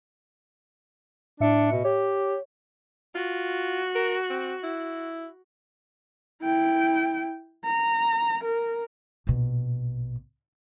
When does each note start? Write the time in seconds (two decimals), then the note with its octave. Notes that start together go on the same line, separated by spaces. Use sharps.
1.40 A2 D4 E5 C#7
1.72 B2
1.85 G4 C#5
3.15 F4 F#4
3.95 A#4
4.30 C4
4.63 E4
6.42 E4 G5
7.65 A#5
8.44 A#4
9.27 A#1 B2